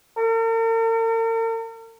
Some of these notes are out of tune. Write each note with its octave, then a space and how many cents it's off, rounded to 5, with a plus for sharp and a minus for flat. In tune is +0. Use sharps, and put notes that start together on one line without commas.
A#4 -45